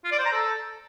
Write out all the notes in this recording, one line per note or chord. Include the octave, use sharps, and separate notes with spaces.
F4
D5
C5
A#5
A4